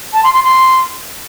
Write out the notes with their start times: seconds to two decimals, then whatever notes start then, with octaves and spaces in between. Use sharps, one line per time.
0.13 A5
0.23 C6
0.34 C6
0.44 C6